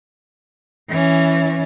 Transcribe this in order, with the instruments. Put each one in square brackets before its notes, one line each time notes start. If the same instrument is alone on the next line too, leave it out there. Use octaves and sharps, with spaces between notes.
[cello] E3 C#4